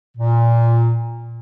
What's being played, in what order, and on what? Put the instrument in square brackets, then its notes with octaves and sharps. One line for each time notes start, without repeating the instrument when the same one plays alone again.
[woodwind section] A#2